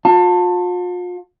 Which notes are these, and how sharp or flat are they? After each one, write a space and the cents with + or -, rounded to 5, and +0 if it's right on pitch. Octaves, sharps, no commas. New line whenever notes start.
F4 +40 A5 +20